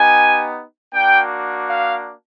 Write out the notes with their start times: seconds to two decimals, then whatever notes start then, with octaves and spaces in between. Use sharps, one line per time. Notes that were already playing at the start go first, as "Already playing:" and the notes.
Already playing: B3 D#4 G4 G#5
0.93 A#3 D4 F#4 G5
1.67 F5